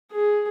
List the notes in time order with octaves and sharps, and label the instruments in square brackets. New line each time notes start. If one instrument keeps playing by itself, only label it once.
[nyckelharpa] G#4